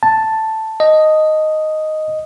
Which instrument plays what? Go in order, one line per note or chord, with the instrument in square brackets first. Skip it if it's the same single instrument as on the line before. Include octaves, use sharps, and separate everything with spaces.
[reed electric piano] A5
[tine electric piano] D#5